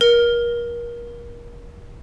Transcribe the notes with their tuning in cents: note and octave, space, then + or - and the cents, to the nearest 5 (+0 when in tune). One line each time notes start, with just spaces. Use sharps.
A#4 +30